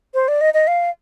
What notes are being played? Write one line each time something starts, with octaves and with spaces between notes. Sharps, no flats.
C5
D5
D#5
D#5
F5